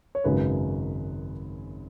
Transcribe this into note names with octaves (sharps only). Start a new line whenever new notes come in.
C#5
G#1 F#2 C#3 F#3 B4